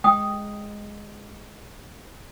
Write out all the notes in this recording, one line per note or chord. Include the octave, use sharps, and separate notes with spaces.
G#3 G5 D#6